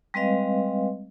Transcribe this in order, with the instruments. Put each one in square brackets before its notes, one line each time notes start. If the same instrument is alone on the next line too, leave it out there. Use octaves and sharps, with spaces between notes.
[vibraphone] G3 G#3 C4 B4 D#5 F5